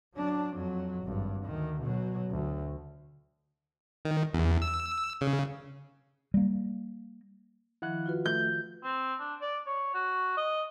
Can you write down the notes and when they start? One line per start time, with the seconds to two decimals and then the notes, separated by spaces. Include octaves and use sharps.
0.15 F#3 D4
0.54 F2 F#3
1.04 G#1 G2
1.46 D2 D#3
1.81 B2 F#3
2.30 D2
4.05 D#3
4.34 E2
4.62 E6
5.21 C#3
6.34 G3 A#3
7.82 D#3 F3 E4 F#5 F#6
8.06 F4 F#4 B4
8.26 A3 G6
8.84 C4
9.20 D4
9.41 D5
9.67 C#5
9.94 F#4
10.37 D#5